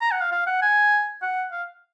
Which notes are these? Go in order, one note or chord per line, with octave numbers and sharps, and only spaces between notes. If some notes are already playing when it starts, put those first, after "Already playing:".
A#5
F#5
F5
F5
F#5
G#5
F#5
F5